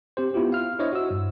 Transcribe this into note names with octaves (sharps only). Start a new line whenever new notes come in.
C4 G4 C5
B3 E4 F4 G4
F5 F6
D4 E4 C5 C#5 D#5 E5
F#4 E6
G2